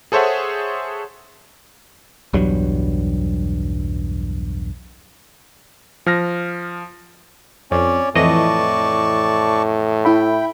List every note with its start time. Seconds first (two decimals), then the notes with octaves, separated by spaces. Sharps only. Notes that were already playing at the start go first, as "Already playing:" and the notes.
0.12 G#4 A4 C5 C#5 E5 F#5
2.33 B1 E2 G2 F#3
6.06 F3 F6 A#6
7.71 F2 C#4 C#5 D5
8.15 F2 A2 E3 D5 D#5 A5 C#6
10.05 E4 E5 G5 B5